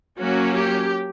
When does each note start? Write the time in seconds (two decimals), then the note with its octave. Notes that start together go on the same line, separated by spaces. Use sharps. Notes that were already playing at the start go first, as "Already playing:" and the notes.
0.20 F#3 A#3 C#4 F#4
0.55 G4